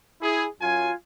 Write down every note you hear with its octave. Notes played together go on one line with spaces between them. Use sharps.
E4 G#4
F#2 F#3 F4 G#5